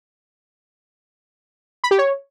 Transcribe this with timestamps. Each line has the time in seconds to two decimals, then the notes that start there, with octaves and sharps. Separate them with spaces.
1.84 B5
1.91 G4
1.98 C#5